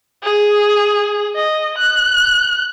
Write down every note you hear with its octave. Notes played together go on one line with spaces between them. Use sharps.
G#4
D#5
F#6